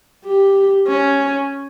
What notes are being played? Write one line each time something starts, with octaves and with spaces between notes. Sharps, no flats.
G4
C#4